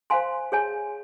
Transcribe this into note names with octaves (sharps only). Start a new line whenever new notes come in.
C5 F5 G#5 C6
G#4 C#5 G#5